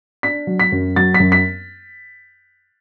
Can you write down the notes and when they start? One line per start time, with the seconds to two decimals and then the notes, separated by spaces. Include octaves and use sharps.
0.23 D4 B6
0.47 F#3
0.60 B6
0.72 F#2
0.96 F#3 A6
1.14 B6
1.20 F#2
1.32 B6